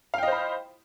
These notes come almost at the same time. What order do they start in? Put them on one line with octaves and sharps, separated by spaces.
F5 G5 D#5 C5 B5